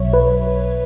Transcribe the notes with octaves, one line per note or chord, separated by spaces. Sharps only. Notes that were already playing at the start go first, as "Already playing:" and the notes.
Already playing: B1 B2 F#3 C#5 E5
B4